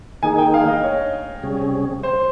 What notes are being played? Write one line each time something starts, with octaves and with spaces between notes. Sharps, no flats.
D#3 A#3 D#4 G#4 G#5
G5
F5
D#5
C#5
C3 G3 C#4 G#4
C5